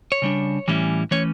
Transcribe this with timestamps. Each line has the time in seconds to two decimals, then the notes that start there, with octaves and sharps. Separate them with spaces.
0.12 C#5
0.22 C#3 G3 D4
0.68 A2 E3 G3 C#4 E4
1.11 E3 A3 C#4 C#5